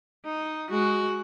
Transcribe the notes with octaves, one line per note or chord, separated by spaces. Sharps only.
D#4
G#3 F#4